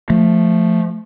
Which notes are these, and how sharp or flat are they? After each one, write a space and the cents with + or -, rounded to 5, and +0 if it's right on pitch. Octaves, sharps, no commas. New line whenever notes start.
F3 +0 A3 +0